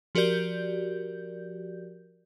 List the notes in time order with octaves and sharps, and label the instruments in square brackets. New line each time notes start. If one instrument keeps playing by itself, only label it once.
[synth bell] F3 F#4 G4 A#4 D5 G6